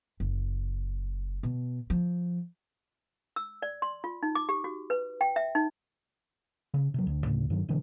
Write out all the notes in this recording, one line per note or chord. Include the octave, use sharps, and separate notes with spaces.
F#1
B2
F3
E6
D5
C6
F4
D#4
D6
G4
F#4
B4
G5
E5
D#4
C#3
C3 F#3
D2
D2 A2 C#3
G2 D#3 F#3
B2 D3 E3 G#3